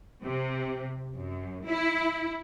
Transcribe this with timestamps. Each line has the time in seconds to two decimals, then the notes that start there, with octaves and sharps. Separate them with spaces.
0.24 C3
1.15 F#2
1.66 E4